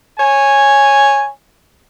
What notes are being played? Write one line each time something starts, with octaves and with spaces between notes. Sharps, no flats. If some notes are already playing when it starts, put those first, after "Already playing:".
C#5 G#5